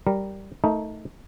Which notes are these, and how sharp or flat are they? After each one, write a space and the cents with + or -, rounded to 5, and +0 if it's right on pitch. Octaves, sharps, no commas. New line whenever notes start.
G3 -10 A#4 -10
A3 +5 D#4 +20 A#4 +0